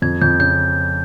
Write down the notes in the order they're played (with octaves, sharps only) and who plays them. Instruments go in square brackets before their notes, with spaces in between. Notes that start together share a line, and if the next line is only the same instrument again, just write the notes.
[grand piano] F2 [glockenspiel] G#6
[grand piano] F2 [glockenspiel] G6
[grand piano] C#3 [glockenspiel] G6